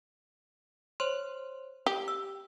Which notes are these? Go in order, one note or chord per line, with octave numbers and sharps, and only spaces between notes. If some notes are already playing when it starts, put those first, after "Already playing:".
C5 C#5 C6
G4
E6